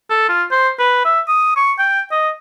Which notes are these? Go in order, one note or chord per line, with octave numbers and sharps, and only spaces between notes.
A4
F4
C5
B4
E5
D#6
C#6
G5
D#5